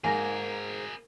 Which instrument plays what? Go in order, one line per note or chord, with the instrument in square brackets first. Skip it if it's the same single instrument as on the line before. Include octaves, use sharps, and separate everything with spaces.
[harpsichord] G#2 [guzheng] A#3 [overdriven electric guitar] G#4 A#4 [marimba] G#5 A#6